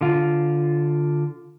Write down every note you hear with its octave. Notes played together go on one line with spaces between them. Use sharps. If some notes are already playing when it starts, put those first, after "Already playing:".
D3 F4